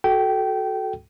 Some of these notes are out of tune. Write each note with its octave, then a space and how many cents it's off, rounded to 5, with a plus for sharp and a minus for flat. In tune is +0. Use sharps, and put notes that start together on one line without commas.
F#4 +0 A4 -15 G5 -20